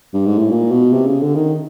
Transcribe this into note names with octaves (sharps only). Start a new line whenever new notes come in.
G2
G#2
A2
A#2
B2
C3
C#3
D3
D#3